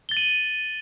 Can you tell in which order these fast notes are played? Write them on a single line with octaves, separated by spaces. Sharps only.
G7 A6 F#7 D#7